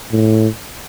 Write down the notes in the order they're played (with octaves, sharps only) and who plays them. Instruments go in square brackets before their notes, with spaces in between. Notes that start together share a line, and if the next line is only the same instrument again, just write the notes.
[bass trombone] A2